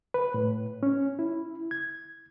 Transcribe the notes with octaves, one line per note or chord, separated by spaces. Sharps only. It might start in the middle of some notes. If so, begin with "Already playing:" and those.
B4
A2
C#4
E4
G#6